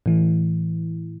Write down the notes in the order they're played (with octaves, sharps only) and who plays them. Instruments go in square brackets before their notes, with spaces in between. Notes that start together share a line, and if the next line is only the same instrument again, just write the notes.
[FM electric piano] A2 E3